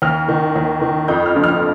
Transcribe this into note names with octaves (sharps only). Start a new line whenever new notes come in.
D#2 F6
D#3
D#2
D#3
F2 G6
F6
D3 F3
F6